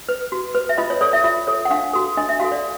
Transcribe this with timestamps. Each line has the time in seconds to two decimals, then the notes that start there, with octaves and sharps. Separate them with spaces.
0.09 B4
0.32 F#4
0.55 B4
0.69 E5
0.78 F4 D#5
0.90 C#5
1.01 A4 C#5 D5
1.13 E5
1.24 F4 E5
1.47 A4 C#5
1.65 F#5
1.71 D4 F5
1.93 F#4 A4
2.17 D4 D#5
2.29 E5
2.40 F#4 A4 F5
2.52 D5